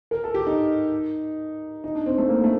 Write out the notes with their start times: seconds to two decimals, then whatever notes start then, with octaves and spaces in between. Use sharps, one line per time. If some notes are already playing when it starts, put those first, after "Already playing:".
0.11 A#4
0.24 A4
0.34 G4
0.47 D#4
1.84 D#4
1.95 D4
2.06 C4
2.18 A3
2.29 A#3
2.44 A3